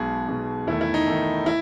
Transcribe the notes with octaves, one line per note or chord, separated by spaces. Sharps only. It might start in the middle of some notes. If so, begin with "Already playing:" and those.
Already playing: B1 B2 G#3 G#4
B1 B2 G#3
E2 D#3 A3 E4
E4
D#4
E2 D#3 A3
E4